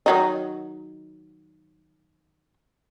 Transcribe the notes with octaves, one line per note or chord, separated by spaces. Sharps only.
D#3 F#3 D#4